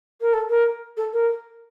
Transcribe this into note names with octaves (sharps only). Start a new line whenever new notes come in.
A#4
A4
A#4
A4
A#4